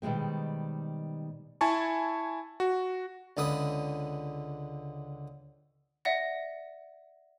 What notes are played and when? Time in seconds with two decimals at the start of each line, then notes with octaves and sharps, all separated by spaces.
0.02 B2 D#3 G3 G#3 C4
1.61 E4 G#5 A5 C#6
2.60 F#4
3.37 C#2 D3 B4 D#6
6.05 D5 E5 F#5 A#6